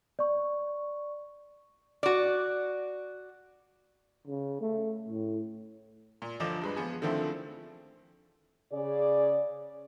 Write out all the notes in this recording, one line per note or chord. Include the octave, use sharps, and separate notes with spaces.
D5 C#6
F#4 D5
C#3
A3
A2
A#2
G1 D2 F3 D#5 D6 E7
G2 G#3 B4
F3 B3 G#4
D3 D#3 F3 A3 C4 E4
C#3 G#4 D5